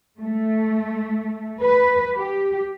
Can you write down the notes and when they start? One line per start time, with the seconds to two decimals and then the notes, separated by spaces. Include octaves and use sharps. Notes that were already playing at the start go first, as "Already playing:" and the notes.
0.19 A3
1.61 B4
2.16 G4